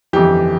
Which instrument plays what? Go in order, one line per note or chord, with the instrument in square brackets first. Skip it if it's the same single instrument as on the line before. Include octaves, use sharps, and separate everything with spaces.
[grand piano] G1 F2 E3 G4